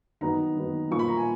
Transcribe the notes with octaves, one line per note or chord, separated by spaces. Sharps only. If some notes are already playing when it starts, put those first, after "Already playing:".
D#3 F#3 B3 D#4 A#5
D#3 F#3 B3 D#4
A#2 F3 A#3 C#6
B5
A#5
G#5